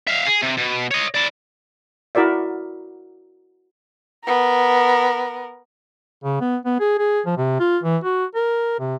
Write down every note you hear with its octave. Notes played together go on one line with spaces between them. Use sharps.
E5 F5
G#4
C3
B2
C#5 D#5
E4 D5
E4 F#4 A#4 D5 E5
B3 A#4
C#3
B3
B3
G#4
G#4
F3
C3
F4
E3
F#4
A#4
C3